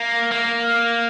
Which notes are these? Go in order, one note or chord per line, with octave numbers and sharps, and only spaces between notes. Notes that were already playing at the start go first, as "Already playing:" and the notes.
Already playing: A#3
A#3